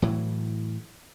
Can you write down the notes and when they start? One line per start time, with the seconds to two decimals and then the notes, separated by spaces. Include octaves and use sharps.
0.02 A2 E3 F#3